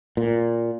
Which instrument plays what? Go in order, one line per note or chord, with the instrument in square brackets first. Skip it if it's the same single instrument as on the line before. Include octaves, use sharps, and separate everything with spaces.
[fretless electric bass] A#2